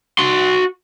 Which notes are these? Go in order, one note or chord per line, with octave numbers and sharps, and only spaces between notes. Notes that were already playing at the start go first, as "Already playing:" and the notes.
F#4 C6